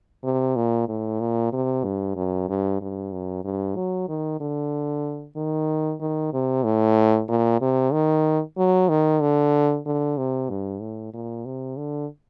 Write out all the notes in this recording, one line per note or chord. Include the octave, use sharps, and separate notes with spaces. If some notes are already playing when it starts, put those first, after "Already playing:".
C3
A#2
A2
A#2
C3
G2
F#2
G2
G2
F#2
G2
F#3
D#3
D3
D#3
D#3
C3
A2
A#2
C3
D#3
F#3
D#3
D3
D3
C3
G2
A2
A#2
C3
D3